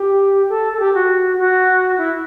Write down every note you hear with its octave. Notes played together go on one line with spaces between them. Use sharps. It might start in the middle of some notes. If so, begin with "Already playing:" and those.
Already playing: G4
A4
A4
G4
F#4
F#4
E4